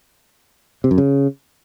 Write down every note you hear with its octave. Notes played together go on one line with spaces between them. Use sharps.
C3
F#2
C#3